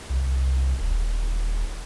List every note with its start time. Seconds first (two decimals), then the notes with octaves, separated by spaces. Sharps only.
0.10 C2
0.80 D#1